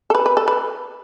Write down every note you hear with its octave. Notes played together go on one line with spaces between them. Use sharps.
A4
B4
B4
A4
B4